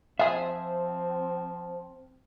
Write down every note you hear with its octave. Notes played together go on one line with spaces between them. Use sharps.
F3 C4 F4 G#4 E5